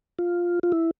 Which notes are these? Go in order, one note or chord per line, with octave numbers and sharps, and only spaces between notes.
F4
F4
E4